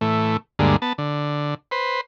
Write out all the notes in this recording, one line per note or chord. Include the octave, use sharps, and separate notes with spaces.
A2 E3 A3
D2 G2 D3 G#3 A#3
B3 A5
D3
B4 C5